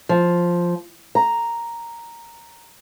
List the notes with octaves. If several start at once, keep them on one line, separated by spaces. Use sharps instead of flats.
F3
A#5